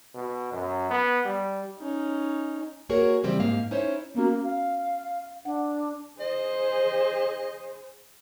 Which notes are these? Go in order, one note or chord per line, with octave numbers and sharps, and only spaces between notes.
B2
F#2
B3
G3
C#4 D#4
A#3 F#4 G#4 A#4 C#5
C#3 E3 G3 C4
G#2 A#3 F5
C#4 D#4 E4 C5 C#5
A#3 B3 C#4 F#4
F5
D4 F#5
G#4 C5 D#5